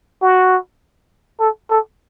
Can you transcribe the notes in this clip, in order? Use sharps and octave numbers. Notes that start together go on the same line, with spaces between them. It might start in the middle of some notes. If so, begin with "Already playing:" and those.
F#4
A4
A4